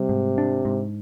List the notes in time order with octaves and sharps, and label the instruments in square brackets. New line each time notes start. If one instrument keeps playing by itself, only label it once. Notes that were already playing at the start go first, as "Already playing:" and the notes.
Already playing: [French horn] C3 [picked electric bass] G3
[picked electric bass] G#2
D4
G#2